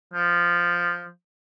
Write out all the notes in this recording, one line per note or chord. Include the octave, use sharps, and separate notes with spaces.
F3